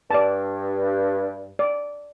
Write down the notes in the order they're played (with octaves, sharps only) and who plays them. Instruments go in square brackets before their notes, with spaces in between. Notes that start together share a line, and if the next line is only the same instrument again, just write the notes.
[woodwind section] G2 [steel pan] D5 A5
[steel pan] D5